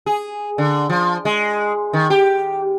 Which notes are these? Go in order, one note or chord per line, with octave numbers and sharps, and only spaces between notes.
G#4
D3
F3
G#3
D#3
G4